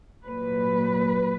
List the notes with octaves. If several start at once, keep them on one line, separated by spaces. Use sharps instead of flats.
A#2 F#3 B4